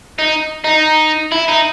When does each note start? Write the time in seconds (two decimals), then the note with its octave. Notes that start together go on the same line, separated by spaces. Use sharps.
0.19 D#4
0.64 D#4
1.32 E4
1.48 D#4